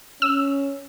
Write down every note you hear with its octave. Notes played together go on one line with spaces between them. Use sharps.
C#4 E6